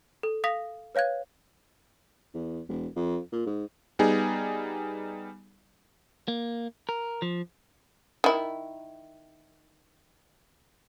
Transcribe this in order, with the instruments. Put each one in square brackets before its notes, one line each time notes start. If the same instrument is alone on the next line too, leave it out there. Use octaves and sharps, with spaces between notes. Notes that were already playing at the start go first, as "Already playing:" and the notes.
[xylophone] A4
F5 D#6 A#6 B6 F7
B4 C#5 F5 F#6 G#6
[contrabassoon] E2
E1
F2
A#2
G#2
[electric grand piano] G3 B3 D#4 G#4
[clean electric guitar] A#3
A#4
F3
[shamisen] D#3 E4